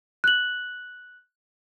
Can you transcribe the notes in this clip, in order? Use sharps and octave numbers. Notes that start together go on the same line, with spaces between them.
F#6 F#7